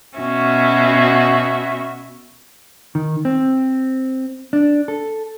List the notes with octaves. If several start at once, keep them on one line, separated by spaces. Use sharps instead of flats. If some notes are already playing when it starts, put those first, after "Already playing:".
B2 C#4 F#4 E5
D#3
C4
D4
A4